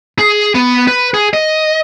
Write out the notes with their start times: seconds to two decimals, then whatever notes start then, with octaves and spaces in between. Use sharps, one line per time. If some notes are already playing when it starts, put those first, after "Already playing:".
0.19 G#4
0.55 B3
0.88 B4
1.14 G#4
1.33 D#5